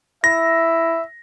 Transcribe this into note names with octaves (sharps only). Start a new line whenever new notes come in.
E4 E5 A#6